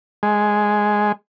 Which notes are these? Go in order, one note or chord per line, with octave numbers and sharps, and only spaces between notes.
G#3